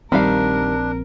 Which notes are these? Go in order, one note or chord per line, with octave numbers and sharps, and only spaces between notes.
A#1 D#3 G3 C4 D4 A#4 F5